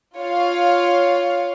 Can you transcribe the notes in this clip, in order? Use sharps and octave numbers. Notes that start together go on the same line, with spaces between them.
F4 C#5 F5